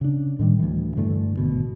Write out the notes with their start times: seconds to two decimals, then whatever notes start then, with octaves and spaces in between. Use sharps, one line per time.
0.01 C#3 D4
0.39 A2 D#3 G3
0.59 D2 E3
0.97 G2 D3 E3 A3
1.37 G#1 B2